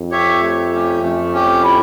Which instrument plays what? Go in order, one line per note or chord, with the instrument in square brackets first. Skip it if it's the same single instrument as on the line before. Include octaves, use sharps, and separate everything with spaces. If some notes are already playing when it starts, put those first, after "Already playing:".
Already playing: [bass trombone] F2
[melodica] G4 C#5 E5
A3
C#4 G4
[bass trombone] F2 [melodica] A3
[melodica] C#4 G4
E4